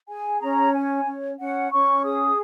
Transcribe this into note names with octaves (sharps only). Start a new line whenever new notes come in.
G#4 G#5
C#4 A#5
C#5 G#5
C#4
C#4 F#5
C#4 C#6
G#4 D#6